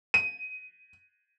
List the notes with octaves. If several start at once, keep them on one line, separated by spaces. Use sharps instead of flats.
D#7